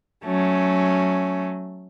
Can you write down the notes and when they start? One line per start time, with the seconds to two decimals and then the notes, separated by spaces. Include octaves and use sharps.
0.24 F#3 A3 C#4